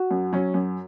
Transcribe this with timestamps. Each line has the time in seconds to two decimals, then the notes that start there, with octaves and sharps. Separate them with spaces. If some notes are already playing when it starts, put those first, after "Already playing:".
Already playing: F#4
0.11 F#2
0.33 F#3 C#4
0.54 F#2